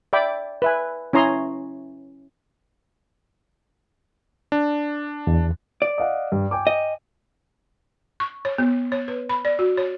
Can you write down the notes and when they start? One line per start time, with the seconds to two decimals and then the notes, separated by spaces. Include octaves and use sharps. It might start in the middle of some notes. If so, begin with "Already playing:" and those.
0.13 D5 E5 G5 B5 D6
0.62 B4 E5 G#5
1.13 C#4 E4 C#5 A#5 C6 D#6
4.52 D4
5.27 E2
5.82 D5
5.98 D#5 F5 F#5
6.32 G2
6.51 G5 G#5 D6
6.67 D#5
8.20 C#6
8.45 C#5
8.58 B3
8.92 C#5
9.08 B4
9.29 B5
9.45 D5
9.59 F#4
9.77 C#5